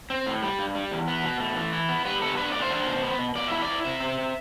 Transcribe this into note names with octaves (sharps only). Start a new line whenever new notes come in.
C4
A2
G3
G2
G3
E2
B3
B2
A3
E3
E4
B3
G3 B4
B3 A4
D4 B4
A3 D5
C5
D4
B2
B3
B2
B2 D5
E4 E5
D5
E4
C3 E5
C4